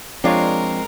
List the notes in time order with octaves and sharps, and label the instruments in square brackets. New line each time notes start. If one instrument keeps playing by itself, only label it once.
[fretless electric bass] F3 [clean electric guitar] G#3 C4 [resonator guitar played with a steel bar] D4 F4 C#5 [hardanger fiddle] A#4